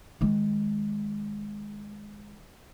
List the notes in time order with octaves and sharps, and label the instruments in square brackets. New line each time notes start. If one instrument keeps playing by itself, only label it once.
[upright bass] D#3 G#3